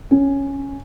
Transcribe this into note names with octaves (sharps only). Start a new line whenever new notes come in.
C#4